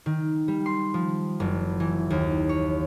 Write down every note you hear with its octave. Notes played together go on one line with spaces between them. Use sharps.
D#3
G3
C6
F3
F#1
E3
D#2
C#5